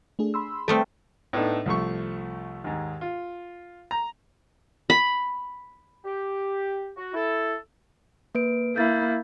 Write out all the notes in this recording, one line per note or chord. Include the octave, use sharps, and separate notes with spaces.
A3 D4 G#4
B5 C6 E6
G3 A3 C4 A4 D#6 F6
A2 B3 D4 D#4 A4
C2 F3 A3 C#6
D#2 G#2
F4
A#5
B5
G4
F#4
E4 A4
A#3 B4 D7
A#3 E4 G6 A6